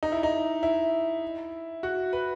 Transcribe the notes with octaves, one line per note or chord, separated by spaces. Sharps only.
D#4
E4
D#4
E4
F#4
B4